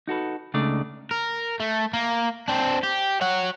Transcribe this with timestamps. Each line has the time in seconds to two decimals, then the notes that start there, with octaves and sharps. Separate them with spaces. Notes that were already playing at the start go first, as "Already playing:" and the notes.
0.08 D#4 F#4 A4 B4
0.54 C#2 C#3 A3 D4 D#4 D5
1.11 A#4
1.60 A3
1.93 A#3
2.48 C4 D4
2.83 G4
3.21 C#5 F#5